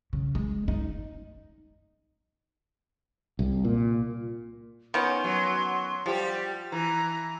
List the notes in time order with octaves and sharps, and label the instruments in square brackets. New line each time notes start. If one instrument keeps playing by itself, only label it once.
[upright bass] C#3
G#3
D#4
[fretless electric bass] C2
A#2
[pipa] D#3 B3 C#4 [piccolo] C6
[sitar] F#3
[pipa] F3 [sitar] G3 G4
[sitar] E3 [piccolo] A#5